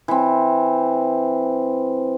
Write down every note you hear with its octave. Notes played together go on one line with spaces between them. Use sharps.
E3 C4